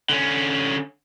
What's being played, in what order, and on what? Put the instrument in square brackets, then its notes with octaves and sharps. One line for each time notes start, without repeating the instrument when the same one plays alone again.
[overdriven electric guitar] D3 C#4